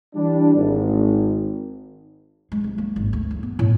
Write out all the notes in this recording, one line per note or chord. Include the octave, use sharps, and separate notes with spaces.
E3 G3 D4
G#1
G#3
C2
A#3
G#1
D2
F#1
B3
A2